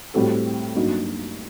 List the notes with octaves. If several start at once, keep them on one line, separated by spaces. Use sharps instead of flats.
A2 G3 C4 F#4 A4
G2 F#3 A#3 D#4 F#4